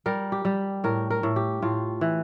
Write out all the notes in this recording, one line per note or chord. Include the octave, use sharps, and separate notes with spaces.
G3 A#4
G4
G3
A2 A#4
A#4
A2
G4
A2 F4
E3